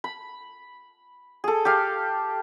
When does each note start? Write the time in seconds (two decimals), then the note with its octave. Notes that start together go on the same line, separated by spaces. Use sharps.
0.04 B5
1.44 G#4 A4
1.65 G4 A4 F5